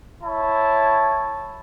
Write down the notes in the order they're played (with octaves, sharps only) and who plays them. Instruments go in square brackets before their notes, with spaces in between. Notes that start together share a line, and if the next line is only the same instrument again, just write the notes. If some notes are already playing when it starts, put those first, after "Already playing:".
[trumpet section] E4 C#5 A5